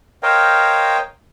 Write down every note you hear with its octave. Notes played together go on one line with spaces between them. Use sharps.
A#4 C5 C#5 D#5 F5 G5